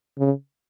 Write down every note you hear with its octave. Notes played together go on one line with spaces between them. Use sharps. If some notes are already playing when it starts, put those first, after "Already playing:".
C#3